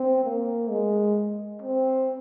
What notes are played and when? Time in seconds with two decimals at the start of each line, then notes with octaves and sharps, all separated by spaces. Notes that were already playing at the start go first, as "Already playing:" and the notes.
Already playing: C4
0.24 A#3
0.70 G#3
1.62 C4